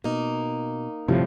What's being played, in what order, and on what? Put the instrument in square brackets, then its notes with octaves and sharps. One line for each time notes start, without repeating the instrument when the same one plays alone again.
[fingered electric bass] B2 [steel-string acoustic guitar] A#3 D#4
[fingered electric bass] G1 [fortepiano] A2 G3 [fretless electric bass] C3 F3